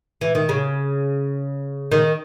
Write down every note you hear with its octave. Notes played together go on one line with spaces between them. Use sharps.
E3
D#3
C#3
D#3